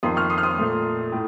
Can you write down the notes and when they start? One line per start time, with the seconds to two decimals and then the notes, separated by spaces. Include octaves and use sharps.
0.03 F2 D#3 A#3 C6 D#6
0.16 C#6 F6
0.30 C6 D#6
0.38 F6
0.43 C6 D#6
0.58 A#2 A3
1.12 A2